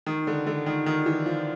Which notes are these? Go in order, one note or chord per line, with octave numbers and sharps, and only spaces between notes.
D#3
D3
D3
D#3
D#3
E3
F3